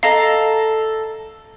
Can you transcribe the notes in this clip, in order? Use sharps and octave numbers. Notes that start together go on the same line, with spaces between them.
A4 D#5 F5 A#5